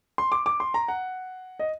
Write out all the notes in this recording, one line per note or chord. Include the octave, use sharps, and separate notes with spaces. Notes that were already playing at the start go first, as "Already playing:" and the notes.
C6
D6
D6
C6
A#5
F#5
D#5